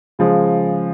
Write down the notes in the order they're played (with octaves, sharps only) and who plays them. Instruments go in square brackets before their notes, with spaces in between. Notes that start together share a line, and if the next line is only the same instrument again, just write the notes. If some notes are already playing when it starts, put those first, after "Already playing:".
[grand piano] C#3 F3 G#3